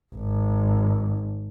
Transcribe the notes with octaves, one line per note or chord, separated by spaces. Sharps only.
G#1